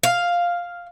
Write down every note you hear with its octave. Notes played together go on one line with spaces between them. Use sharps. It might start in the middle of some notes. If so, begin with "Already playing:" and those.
F5